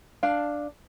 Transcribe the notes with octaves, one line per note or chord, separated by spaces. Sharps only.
D4 F5